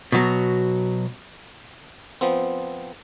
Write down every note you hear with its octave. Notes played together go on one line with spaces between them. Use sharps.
B2 F#3
F3 B3 C4